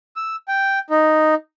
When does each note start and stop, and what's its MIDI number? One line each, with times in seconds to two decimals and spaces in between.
0.16 0.36 88
0.48 0.79 79
0.90 1.35 63